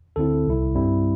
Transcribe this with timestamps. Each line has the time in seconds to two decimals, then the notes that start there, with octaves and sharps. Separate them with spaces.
0.16 D2 D3 C4 E4 A4
0.46 C2 C3 G3 E4
0.75 G2 G3 C4 E4